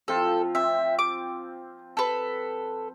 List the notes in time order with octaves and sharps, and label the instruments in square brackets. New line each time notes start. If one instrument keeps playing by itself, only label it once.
[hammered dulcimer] F3 C4 F4 [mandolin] A4
[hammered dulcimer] C4 [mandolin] E5
[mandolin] D6
A4 B4